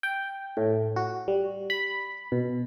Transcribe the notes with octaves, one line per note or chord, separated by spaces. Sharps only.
G5
A2
F#4
G3
B5
B2